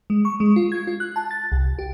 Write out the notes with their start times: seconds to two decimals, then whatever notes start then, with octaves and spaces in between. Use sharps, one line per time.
0.10 G#3
0.25 C#6
0.40 G#3
0.56 F4
0.72 G#6
0.87 F4
1.00 F#6
1.16 A5
1.31 A6
1.52 C2
1.79 G4